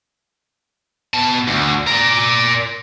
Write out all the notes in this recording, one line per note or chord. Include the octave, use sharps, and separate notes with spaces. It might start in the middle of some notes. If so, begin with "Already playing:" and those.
B2 A5
D2
A#4 D5